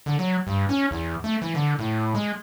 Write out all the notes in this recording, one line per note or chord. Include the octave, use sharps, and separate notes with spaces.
D3
F#3
G2
C#4
E2
A3
E3
D3
A2
G#3